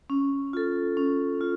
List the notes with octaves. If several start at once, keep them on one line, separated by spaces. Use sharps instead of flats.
C#4
F4 A4
C#4
F4